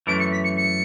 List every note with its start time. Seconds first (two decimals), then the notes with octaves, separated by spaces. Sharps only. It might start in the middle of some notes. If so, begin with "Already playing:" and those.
0.07 F#2 E3 A3 D7
0.20 C#7
0.32 B6
0.44 C#7
0.57 C#7